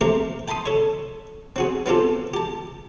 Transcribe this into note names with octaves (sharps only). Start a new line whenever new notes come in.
A3 A#3 C4 G4 A#4
G5 A5 B5 C6 D#6
A4 C#5
C4 F#4 G#4
B3 C4 F4 G4 A4
G4 A5